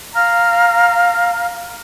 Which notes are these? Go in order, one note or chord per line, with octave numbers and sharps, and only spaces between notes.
F5 A#5 F6